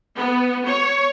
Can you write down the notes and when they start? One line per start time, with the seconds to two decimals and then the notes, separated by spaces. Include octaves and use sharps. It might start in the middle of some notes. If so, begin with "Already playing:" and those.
0.17 B3
0.67 C#5